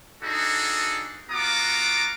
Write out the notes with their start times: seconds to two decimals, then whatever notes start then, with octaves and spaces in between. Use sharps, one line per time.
0.22 D4 D#4 F#4 G#4 A4
1.30 B3 F4 F#4 A#5 D6